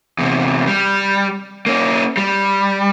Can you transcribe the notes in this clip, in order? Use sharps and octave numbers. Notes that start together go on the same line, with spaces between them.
E2 C3
G3
A#3 C#4
G3